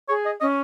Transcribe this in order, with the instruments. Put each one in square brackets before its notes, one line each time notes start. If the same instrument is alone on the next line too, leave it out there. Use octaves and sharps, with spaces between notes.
[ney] G#4 [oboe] C#5
[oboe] D#5
[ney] C#4 [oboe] D#5